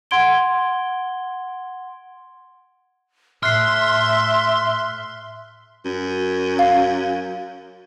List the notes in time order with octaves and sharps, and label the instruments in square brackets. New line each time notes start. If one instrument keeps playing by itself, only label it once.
[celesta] F#5 C6 G#6 D7 G7
[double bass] A2 [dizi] E5 [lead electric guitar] C6 [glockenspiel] F6 F#6 C7
[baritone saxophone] F#2
[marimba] F5